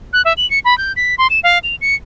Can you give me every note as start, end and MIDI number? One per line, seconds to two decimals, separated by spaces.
0.13 0.22 90
0.25 0.33 76
0.37 0.49 102
0.50 0.59 97
0.65 0.77 83
0.78 0.93 91
0.96 1.15 95
1.18 1.27 84
1.30 1.40 100
1.44 1.58 77
1.64 1.75 101
1.81 1.95 97